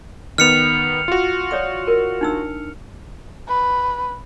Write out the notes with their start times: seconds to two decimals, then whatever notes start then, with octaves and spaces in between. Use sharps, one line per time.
0.38 D#3 B3 F6 C#7 F7
1.08 F4 F#4
1.51 C#5 D5 D#6
1.88 A#4
2.21 D4 D#4 E6
3.48 B4